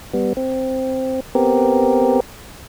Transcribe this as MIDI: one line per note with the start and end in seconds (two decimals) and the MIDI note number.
0.13 0.33 55
0.13 0.33 59
0.37 1.20 60
1.35 2.20 59
1.35 2.20 60
1.35 2.20 67
1.35 2.20 70